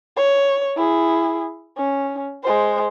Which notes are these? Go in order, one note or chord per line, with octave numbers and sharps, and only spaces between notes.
C#5
E4 G#4
C#4
G#3 C5